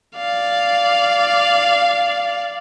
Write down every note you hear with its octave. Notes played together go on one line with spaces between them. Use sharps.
D5 F5